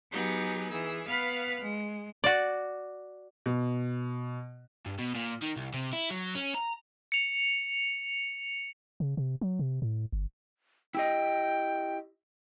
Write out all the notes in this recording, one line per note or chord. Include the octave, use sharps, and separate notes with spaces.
F#3 B3 D#4 G4 G#4
E3 G#4 E6
B3 B4 F5 B5 F6
G#3
F#4 D5
B2
G2
B2
A#2
D#3
C2
C3
E4
F#3
C#4
A#5
C#7 F7
C#3
C3
F#3
C3
A2
G1
E4 G4 D#5 G5